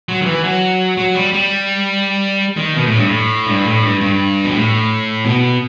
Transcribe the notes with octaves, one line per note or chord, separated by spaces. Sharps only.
F#3
D#3
E3
F#3
F#3
G3
G3
D#3
B2
A2
G2
A2
G2
A2
G2
G2
B2
A2
B2